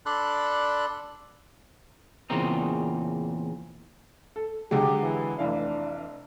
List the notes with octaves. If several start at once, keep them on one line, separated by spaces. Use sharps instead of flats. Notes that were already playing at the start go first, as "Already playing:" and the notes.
D4 A4 D5 B5 C6 F#6
E2 A#2 C#3 C4 D#4
A4
D3 F#3 G#3 G4
E3
F1 E3 D4 F5